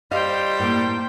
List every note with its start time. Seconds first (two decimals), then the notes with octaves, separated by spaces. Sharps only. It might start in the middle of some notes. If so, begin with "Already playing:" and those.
0.11 G3 C5 D#5 F5 G5
0.60 A2 A#3